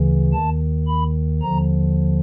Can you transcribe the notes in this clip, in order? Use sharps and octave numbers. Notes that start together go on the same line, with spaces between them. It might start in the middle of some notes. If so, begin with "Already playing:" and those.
Already playing: D2 C#3 E3
D#2 D#3 A5
B5
D#2 D3 F3 A#5